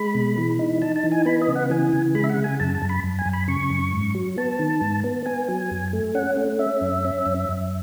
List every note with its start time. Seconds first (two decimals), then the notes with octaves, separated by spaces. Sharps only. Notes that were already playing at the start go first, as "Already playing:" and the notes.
Already playing: G#3 B5
0.15 B2
0.38 E3
0.59 D#4
0.82 D#4 A5
0.96 A5
1.04 E3
1.12 G#5
1.26 B3 B5
1.42 D#5
1.48 C#3
1.56 F#5
1.70 E3 G#5
1.93 C#3
2.15 G#3 B5
2.24 E5
2.30 F#5
2.38 C#3
2.44 G#5
2.60 F#2 A5
2.75 A5
2.82 F#2
2.89 B5
3.04 F#2
3.19 G#5
3.26 F#2
3.34 B5
3.48 C#3 C#6
3.70 F#2
3.93 G#2
4.15 F#3
4.37 B3 A5
4.59 D#3
4.81 G#2
5.04 B3
5.26 B3 G#5
5.49 F#3
5.71 F#2
5.93 A3
6.15 C#4 F#5
6.37 A3
6.59 C#4 E5
6.81 F#2
7.05 C#4
7.26 F#2
7.49 F#2